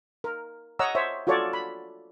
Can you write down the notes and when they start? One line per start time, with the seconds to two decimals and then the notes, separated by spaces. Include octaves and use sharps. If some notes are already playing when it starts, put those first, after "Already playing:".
0.24 A#4
0.79 C#5 D#5 F#5 A#5 E6
0.95 C5 C#5 E5
1.27 F4 F#4 A4 C#5 D5
1.53 B5